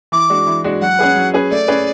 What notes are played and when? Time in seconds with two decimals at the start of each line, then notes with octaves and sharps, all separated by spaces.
0.12 E3 D6
0.30 G#3 D4 F#4
0.47 E3
0.64 G#3 D4 F#4
0.81 F#3 F#5
0.99 C#4 G#4 B4
1.16 F#3
1.34 C#4 G#4 B4
1.50 A3 D5
1.68 C#4 G#4 B4